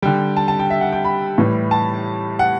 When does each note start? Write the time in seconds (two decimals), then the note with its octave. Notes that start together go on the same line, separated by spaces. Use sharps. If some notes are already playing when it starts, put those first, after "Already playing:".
0.02 D3 G3 G5
0.37 A5
0.48 A5
0.59 G5
0.70 E5
0.81 F#5
0.92 G5
1.05 B5
1.38 A2 E3 G3
1.71 A5
2.39 F#5